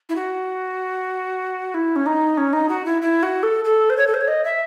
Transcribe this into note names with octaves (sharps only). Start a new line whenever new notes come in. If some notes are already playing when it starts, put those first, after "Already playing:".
E4
F#4
E4
C#4
D#4
C#4
D#4
F#4
E4
E4
F#4
A4
A4
C5
C#5
A4
C5
C#5
D#5
E5